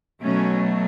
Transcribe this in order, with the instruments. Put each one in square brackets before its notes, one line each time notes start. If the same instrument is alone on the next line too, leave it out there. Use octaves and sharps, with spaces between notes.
[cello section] B2 F#3 A3 C#4